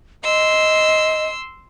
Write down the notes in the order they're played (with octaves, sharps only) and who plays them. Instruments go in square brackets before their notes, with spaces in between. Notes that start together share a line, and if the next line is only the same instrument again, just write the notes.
[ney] D#5 [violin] C6 E6